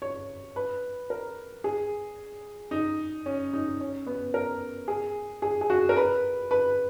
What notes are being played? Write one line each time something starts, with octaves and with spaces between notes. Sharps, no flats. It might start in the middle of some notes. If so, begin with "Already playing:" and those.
C#5
B4
A#4
G#4
D#4
C#4
D#4
C#4
B3
A#4
G#4
G#4
G#4
F#4
A#4
B4
B4